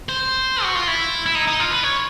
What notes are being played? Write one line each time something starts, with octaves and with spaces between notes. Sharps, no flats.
C5
F#4
F4
E4
E4
D#4
D#4
F4
B4
C#5